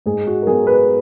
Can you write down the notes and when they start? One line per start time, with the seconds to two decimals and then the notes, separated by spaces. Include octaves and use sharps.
0.06 G#2 G#4
0.27 F#4
0.42 A#4
0.47 F#3 B3 G#4
0.67 B4